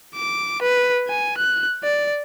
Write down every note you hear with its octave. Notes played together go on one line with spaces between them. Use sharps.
D6
B4
G#5
F#6
D5